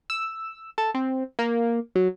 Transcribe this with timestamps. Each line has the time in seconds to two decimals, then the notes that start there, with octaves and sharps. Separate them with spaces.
0.10 E6
0.78 A4
0.94 C4
1.39 A#3
1.95 F#3